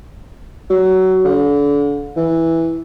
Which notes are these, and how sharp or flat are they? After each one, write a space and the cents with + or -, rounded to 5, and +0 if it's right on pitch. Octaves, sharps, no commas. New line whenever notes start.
F#3 +20
D3 -35
E3 -5